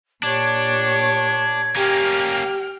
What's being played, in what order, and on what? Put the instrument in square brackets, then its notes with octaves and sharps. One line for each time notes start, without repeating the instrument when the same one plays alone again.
[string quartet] A#2 G4 C#5 [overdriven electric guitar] D4 [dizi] G#6
[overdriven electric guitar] A#3 C#4 [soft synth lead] G4 [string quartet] G5 F6